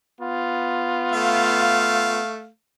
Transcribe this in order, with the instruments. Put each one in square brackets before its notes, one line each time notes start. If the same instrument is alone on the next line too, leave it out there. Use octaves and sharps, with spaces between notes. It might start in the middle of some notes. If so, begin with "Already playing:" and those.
[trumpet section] B3 F4
[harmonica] A3 F5